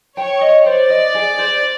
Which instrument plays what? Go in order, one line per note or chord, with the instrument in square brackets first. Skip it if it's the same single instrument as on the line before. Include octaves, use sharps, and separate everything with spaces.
[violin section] C#5 [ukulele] G5
[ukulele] D#5
[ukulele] C5 [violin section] D5
[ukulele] D#5
G#4
C5